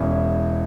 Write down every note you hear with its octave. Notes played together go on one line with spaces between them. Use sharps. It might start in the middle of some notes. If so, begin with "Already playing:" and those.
Already playing: E1 E2 E3 C#4 E4
E4